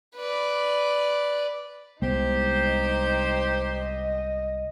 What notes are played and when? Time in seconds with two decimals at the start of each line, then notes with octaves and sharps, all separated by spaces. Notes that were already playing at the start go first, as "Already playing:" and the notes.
0.16 B4 D5
2.02 C2 G#3 B3 D#4 G4 C5
3.77 D#5